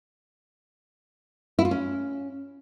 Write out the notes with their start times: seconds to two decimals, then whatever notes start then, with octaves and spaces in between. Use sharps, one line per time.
1.59 E4
1.65 F4
1.71 C#4